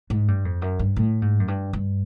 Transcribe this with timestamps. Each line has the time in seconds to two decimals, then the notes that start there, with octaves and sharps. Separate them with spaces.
0.10 G#2
0.28 G2
0.45 F2
0.62 F#2
0.79 G2
0.96 A2
1.22 G#2
1.40 F#2
1.48 G2
1.73 G2